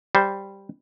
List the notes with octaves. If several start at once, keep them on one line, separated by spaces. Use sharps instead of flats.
G3 C5